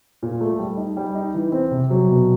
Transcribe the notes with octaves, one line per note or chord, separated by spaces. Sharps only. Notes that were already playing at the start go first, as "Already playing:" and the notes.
A#2
A3
G3
D#4
G3
D#4
E3
C4
C3
F#3
B2